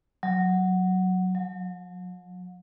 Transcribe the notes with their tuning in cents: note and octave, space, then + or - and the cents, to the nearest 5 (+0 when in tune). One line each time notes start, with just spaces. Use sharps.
F#3 +0
F#3 -45